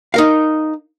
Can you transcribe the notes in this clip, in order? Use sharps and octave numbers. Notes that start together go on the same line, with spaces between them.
D#4 A#4 F5